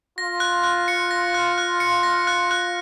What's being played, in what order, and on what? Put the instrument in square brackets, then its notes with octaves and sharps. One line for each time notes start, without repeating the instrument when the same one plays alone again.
[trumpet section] F4 [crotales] A#6
[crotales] F#6
F#6
C#7
A#6
F#6
F#6
C#7
A#6
F#6
F#6